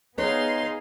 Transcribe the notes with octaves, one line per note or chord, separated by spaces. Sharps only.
B3 D#4 G#4 B4 C#5 F5 C6